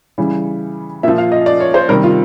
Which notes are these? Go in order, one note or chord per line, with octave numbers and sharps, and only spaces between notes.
C#3 E3 G3
A#2 F3 E5
F5
D#5
D5
C#5
C5
C3 D#3 G3 A#4
F4